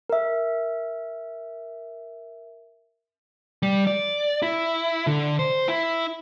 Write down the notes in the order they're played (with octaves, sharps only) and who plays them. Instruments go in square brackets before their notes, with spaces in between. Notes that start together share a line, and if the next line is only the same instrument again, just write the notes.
[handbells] A#4 E5
[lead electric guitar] G3
D5
E4
D3
C5
E4